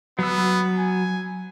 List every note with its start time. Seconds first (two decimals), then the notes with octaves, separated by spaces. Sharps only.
0.19 F#3 B3 E6
0.78 G#5